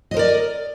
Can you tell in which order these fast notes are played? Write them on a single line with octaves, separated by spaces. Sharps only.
D#5 C5 A#4 D5